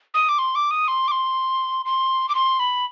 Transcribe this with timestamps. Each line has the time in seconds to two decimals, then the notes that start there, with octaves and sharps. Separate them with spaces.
0.14 D#6
0.29 D6
0.39 C6
0.55 D6
0.71 D#6
0.88 C6
1.08 D6
1.12 C6
1.86 C6
2.29 D6
2.35 C6
2.60 B5